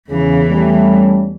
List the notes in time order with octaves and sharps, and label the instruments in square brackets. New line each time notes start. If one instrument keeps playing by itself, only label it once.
[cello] E2 E3 [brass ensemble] C#3
[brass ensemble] G3 A3 C#4